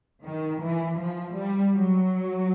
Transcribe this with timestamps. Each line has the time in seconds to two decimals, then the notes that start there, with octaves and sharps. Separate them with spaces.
0.26 D#3
0.62 E3
0.99 F3
1.36 G3
1.74 F#3